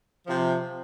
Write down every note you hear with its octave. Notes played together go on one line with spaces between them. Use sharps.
C3 F3